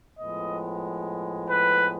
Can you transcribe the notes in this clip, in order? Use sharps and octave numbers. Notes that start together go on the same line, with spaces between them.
A2 F3 G#3 B3 D#5
B4